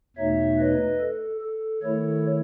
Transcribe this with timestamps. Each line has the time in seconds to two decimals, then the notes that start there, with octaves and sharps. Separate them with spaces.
0.16 E2 B2 A3 D#4 C#5 E5
0.58 B4 D#5
0.99 A4
1.41 A4
1.82 D#3 A3 E4 A4 C#5